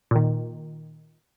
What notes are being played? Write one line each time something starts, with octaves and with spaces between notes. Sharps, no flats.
A#2 D#3